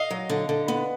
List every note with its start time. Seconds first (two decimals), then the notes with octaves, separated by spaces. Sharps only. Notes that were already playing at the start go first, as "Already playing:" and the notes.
Already playing: D#5 F5
0.11 F#3
0.30 D3
0.49 D3
0.68 B3